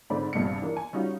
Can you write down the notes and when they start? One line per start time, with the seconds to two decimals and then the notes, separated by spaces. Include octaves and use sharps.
0.10 G#2 D3 C4 D5 B5
0.33 A#1 G2 C3 C#7
0.62 E3 A#3 D4 A#4
0.77 G#5
0.93 G3 C#4 D#4 F4 F#4